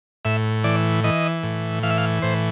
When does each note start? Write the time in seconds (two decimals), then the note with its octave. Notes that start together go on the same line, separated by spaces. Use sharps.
0.25 A2 E5
0.64 E3 D5
1.04 E3 D#5
1.43 A2
1.83 E3 F5
1.90 E5
1.98 F5
2.22 A2 C5